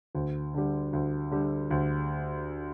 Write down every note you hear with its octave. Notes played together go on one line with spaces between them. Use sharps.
D2
D3 G3
D2
D3 G3
D2